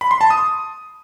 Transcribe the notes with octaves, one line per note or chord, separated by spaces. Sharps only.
B5
C6
A5
D#6